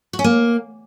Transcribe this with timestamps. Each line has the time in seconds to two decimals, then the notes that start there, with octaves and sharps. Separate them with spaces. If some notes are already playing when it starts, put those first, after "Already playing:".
0.13 F#4
0.19 C#4
0.24 A#3